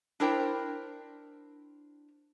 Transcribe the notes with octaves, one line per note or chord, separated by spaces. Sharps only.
D4 E4 A#4 C5 G5